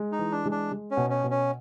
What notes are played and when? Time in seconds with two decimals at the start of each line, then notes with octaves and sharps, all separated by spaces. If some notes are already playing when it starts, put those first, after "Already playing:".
Already playing: G#3
0.12 D#4
0.19 E3
0.32 D4
0.45 G#3
0.51 D4
0.72 G#3
0.91 C#4
0.97 B2
1.10 C#4
1.24 B2
1.31 C#4